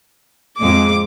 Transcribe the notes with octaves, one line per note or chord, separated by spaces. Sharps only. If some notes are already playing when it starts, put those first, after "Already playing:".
F2 G#3 D6